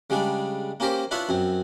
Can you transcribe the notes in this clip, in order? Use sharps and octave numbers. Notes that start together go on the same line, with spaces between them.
C#3 G3 G#3 D4
A#3 C#4 G4 A#4 C5
D4 E4 F4 B4 C#5 E5
F#2 C4